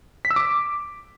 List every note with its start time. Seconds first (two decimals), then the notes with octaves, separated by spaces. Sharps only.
0.25 B6
0.31 E6
0.36 D6